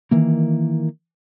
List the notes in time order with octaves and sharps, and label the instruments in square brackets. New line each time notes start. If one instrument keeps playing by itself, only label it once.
[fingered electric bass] D#3 E3 A#3